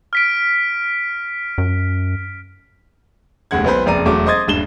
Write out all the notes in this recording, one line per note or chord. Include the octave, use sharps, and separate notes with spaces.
F6 B6 D7
F#2
F1 D#2 G#3 F#5 G#6
B1 B4 C5 B5
F#1 F2 D5 A#5 D#7
E1 F#3 A3 D6
C5 D#5 C6 D#6 G#6 A6
D#1 G2 E7 G7